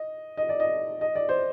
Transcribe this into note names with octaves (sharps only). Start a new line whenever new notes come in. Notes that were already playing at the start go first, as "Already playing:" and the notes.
Already playing: D#5
D#5
D5
D#5
D#5
D5
C5